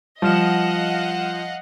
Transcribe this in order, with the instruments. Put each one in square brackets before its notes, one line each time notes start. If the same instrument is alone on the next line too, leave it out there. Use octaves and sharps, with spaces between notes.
[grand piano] F3 [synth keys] G3 F6 E7 [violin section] D#5 F5 F#5